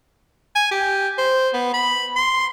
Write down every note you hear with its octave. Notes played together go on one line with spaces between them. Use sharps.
G#5
G4
C5
B3
B5
C6